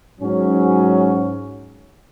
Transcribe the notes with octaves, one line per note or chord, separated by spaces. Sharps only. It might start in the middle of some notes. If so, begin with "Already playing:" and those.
G#2 F#3 C#4